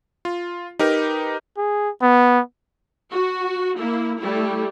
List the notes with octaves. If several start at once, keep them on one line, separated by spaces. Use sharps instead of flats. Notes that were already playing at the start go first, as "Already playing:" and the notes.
F4
D#4 G4 A#4 B4
G#4
B3
F#4
A#3 E4
G3 A3 E4